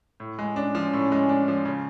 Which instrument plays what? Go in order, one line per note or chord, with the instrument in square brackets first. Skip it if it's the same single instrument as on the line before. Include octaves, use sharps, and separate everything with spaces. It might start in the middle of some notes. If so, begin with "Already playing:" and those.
[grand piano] A2
G#3
[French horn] C#4 [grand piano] D4
[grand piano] F3
A2
G#3
D4
F3
C#3